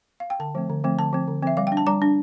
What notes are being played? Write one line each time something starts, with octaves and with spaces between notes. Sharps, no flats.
F5
G5
D3 A5
F3 A3 C4
D3
F3 A3 C4
D3 A5
F3 C4
D3
F3 C4 E5
G3 F5
G5
D4
A5
G3 A#5
D4